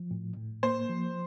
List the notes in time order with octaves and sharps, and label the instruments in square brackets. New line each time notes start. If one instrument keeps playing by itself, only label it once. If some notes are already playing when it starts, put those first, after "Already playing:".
Already playing: [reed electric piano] F3
A2
A2
[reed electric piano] A#3 [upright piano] C5
[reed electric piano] F3